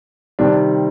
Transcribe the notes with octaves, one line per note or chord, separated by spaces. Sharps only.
C3 D#3 G3 D4